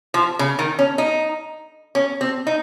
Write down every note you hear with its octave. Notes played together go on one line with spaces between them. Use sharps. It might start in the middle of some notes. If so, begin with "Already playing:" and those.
F3
C#3
D#3
C#4
D#4
C#4
C4
D#4